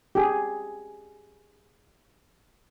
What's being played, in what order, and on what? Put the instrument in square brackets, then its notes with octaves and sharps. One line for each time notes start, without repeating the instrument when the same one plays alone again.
[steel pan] G4 G#4